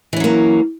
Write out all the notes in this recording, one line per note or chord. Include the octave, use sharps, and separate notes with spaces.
E3 F#3 A#3 C#4